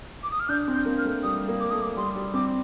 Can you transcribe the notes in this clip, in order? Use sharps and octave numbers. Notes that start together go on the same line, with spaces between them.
D6
D#6
F6
D4 G6
C4
G6
A#3
F6
A3
G3 D#6
A#3
D6
A3 D#6
D6
G3 C6
G3
C4 D6